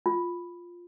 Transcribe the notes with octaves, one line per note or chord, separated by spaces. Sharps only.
F4